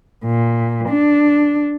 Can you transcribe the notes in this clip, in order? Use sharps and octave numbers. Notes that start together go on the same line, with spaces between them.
A#2
D4